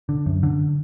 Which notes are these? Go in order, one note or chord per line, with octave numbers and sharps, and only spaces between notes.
D3
F#2
D3